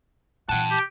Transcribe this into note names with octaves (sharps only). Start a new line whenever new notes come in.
A#2 E3 F#5 G5 A5
G4